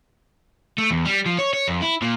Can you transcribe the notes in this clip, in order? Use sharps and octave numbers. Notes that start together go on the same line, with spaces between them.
A3
E2
G3
F3
C#5
C#5
F2
E4
A#2